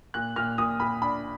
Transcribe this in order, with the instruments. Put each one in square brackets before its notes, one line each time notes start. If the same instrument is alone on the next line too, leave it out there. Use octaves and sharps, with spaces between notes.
[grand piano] A#2 F#6
A#2 F6
A#2 D#6
A#2 B5
D4 B5